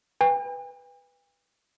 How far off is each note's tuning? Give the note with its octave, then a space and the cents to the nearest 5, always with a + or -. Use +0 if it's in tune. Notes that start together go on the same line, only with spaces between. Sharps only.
B4 +0 G5 +45